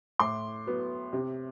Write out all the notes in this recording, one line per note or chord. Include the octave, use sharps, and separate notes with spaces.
A2 C6 D6
F#3 B3
C3